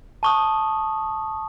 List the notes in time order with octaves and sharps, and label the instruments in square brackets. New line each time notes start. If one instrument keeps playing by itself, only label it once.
[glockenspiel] A5 C#6 D#6